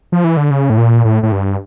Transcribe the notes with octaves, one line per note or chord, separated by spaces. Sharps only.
F3
E3
D3
C#3
A2
A#2
A2
A2
G2